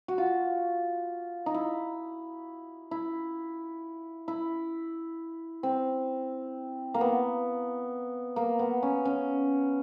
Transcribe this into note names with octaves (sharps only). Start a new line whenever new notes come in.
F#4
F4
D#4
E4
E4
E4
C4
A#3
B3
A#3
B3
C#4
C#4